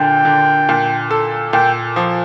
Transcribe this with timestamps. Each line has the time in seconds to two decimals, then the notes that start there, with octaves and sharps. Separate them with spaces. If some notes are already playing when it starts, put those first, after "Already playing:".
Already playing: A#2 D3 G5
0.25 D3
0.69 A#2
1.11 A4
1.53 A#2 G5
1.96 F3